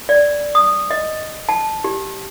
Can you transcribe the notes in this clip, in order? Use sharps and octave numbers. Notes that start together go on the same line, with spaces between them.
D5
D#6
D#5
A5
G4